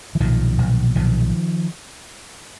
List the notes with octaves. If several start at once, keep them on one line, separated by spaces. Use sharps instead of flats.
E3
B1 A#2 D#3 F3
B1 A#2
B1 A#2 D#3 F3